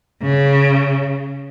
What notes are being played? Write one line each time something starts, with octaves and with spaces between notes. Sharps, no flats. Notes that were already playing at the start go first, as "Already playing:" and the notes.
C#3